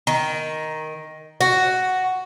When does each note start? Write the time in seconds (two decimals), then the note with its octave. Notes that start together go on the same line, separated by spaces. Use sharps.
0.07 D#3
1.41 F#4